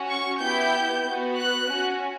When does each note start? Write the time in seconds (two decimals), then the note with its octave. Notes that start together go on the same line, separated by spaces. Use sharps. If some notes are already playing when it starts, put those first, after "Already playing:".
Already playing: C#4 F#4
0.09 C#6
0.41 B3 E4 G4 G6
1.05 B3 F#4
1.36 F#6
1.68 C#4 F#4